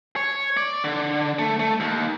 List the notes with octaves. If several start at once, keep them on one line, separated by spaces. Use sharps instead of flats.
C#5
D5
D3
A3
A3
D#2